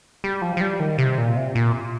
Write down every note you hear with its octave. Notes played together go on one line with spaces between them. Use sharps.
G3
F3
F3
G3
D#3
C3
A#2
C3
A#2